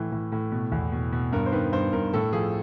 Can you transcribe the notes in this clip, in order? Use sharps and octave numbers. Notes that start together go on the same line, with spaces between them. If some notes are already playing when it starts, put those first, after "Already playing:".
Already playing: A2 E3
A2
A2
B2
E2
B2
B2
G2 A#4
C5
D#3 B4
G2 C5
G2 A#4
A2 A4
F3 G#4